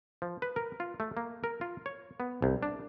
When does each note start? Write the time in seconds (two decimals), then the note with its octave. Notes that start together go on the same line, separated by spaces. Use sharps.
0.22 F3
0.42 B4
0.56 A#4
0.80 F4
1.00 A3
1.17 A#3
1.44 A#4
1.61 F4
1.86 C#5
2.20 B3
2.42 C2
2.63 D4